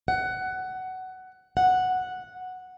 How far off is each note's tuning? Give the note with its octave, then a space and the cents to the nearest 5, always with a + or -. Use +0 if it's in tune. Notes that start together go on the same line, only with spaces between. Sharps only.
F#5 +15
F#5 -5